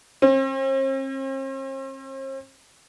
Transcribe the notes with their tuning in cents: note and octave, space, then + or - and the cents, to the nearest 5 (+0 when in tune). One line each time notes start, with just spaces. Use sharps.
C4 +45